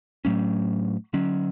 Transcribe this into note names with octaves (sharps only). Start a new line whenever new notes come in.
A2 F#3 A3 C#4
D3 F#3 C#4